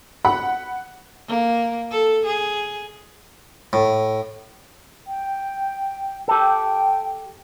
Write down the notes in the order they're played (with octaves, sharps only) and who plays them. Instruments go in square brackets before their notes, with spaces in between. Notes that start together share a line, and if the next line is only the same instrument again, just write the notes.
[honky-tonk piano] F#5 [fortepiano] B5
[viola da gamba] A#3
A4
G#4
[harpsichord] A2
[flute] G5
[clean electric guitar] G4 A4 [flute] G5